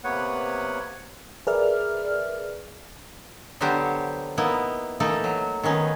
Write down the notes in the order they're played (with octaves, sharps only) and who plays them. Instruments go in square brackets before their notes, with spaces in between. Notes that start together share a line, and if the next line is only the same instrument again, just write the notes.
[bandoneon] C3 A#3 B3 B4 C#5 F#5
[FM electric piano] G#4 A#4 B4 D5 E5 F6
[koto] D3 F#3 B3 F#4 G4 C5
A#3 B3 D#4 E4
E3 A3 A#3 D#4 A4
F#3
D#3 B3 C#4 D#4